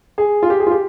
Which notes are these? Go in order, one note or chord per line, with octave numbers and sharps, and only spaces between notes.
G#4
F4
G4
G#4
F4
G4